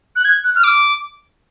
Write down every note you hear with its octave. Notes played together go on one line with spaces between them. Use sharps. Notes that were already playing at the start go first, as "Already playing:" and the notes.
F#6
G#6
F#6
F6
D6